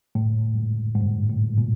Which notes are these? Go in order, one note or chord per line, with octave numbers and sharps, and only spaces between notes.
A2
G#2
G2
A2
A#2